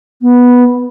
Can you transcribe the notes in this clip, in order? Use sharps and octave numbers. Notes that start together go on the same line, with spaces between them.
B3